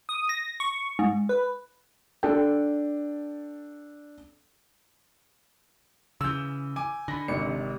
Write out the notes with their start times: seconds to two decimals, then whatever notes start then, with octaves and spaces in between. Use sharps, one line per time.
0.09 D#6
0.29 A#6
0.60 C#6
0.99 G#2
1.29 B4
2.23 D4 A4 G5
6.21 C#3 E3 E6 G6
6.76 G#5 D6
7.08 D3 B5 A#6
7.28 G#1 C3 D#3 C#7